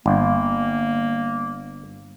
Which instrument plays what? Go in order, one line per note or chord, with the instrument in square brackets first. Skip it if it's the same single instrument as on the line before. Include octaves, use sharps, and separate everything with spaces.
[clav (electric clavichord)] G1 [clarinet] A#3